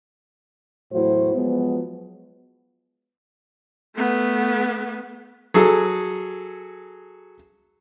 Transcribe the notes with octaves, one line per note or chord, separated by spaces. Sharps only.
E2 A2 F#3 E4 F#4 C5
F3 F#3 G#3 B3
A3 B3
F#3 G#4 A4